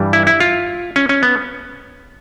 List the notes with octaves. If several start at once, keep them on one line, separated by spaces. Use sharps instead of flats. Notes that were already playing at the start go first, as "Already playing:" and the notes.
Already playing: G2 E3 G3
E4
E4
F4
C#4
C#4
B3